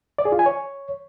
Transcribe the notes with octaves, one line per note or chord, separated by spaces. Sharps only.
D5
G#4
F4
G#5
C#5